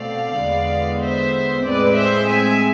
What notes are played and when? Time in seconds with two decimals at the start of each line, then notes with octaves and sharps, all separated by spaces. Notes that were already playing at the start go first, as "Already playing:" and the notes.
Already playing: B2 A3 C4 D5 F5
0.37 E2 D3 G#3 B3
1.00 C5 E5
1.64 A2 G#3 C4 B4 D5
1.95 C5 E5
2.27 E5 G#5